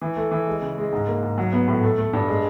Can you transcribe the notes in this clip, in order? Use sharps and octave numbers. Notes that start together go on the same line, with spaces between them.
E3
A3
E3
G#3
C#3
G#3
G#2
A#3
G#2
F#3
B3
A2
A3
A3
G2
G#3